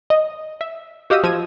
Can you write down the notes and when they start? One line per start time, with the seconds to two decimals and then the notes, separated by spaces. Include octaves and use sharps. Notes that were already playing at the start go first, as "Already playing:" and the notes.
0.10 D#5
0.61 E5
1.10 F#4 G4 D#5 F5 D#6 E6
1.24 F3 E6 G#6 D#7